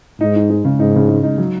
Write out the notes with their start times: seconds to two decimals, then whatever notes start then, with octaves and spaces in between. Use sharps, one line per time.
0.21 G#2 D#4
0.36 D#4
0.50 G#3
0.65 C#3
0.79 G#2 D#4
0.95 C#3
1.09 G#3
1.23 D#4
1.38 F#3